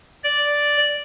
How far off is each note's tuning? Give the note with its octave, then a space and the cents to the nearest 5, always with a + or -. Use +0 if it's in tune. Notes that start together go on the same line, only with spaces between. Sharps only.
D5 -5